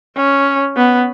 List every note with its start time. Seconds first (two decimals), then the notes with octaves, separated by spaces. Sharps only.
0.17 C#4
0.77 B3